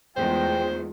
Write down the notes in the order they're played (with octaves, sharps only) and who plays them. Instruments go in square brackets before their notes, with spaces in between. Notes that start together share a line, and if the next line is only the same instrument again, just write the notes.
[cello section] E2 D#3 A3 [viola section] G#3 F4 [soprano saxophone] C5 [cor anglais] G5